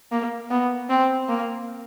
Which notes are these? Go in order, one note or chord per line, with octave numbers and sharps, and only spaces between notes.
A#3
B3
C4
A#3